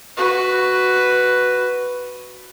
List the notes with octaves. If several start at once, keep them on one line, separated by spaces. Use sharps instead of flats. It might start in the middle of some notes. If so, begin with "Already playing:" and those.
F#4 B4